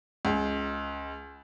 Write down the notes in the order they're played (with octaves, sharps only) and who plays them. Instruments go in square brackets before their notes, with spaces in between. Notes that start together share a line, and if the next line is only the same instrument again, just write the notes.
[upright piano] C#2